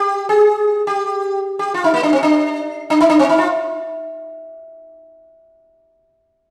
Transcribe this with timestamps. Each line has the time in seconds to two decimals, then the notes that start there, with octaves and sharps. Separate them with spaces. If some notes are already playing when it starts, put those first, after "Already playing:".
Already playing: G4
0.29 G#4
0.87 G4
1.59 G4
1.74 F4
1.84 D#4
1.94 A#3
2.03 D4
2.13 C4
2.23 D4
2.90 D4
3.00 D#4
3.10 D4
3.19 C4
3.29 D#4
3.38 F4